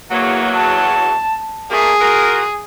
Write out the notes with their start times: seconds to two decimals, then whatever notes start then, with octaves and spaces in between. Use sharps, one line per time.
0.11 E2 F#3 A#3
0.56 A5
1.71 A#2 A3 A#3 G#4
2.00 F4 F#4 A#4